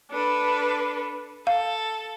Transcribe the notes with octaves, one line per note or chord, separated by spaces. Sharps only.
D4 A4 B4
A4 F5